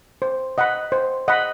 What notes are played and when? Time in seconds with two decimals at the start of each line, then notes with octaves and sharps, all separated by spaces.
0.22 C5
0.58 D#5 F#5 B5
0.92 C5
1.28 D#5 F#5 B5